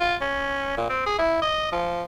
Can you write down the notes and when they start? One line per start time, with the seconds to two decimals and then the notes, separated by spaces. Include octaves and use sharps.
0.01 F4
0.21 C#4
0.77 A#2
0.89 C4
1.06 G#4
1.18 E4
1.42 D#5
1.72 F3